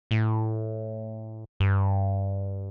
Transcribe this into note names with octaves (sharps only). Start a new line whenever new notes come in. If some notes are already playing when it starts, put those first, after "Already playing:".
A2
G2